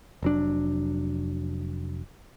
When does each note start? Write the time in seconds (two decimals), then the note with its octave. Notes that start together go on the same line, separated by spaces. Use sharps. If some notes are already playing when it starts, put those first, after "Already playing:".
0.23 F1 F#3 D4